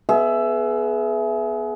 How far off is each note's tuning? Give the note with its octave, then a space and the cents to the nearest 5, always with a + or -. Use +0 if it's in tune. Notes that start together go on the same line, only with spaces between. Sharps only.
B3 +0 G#4 +30 E5 +10